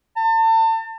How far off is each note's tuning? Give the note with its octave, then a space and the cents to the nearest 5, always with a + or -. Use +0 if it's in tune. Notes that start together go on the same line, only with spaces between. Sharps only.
A5 +35